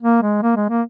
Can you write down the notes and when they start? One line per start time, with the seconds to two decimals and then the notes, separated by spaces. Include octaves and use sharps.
0.02 A#3
0.22 G#3
0.42 A#3
0.56 G#3
0.70 A#3